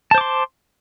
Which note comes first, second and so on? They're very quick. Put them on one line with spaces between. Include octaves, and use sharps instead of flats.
A5 C5 D6 C6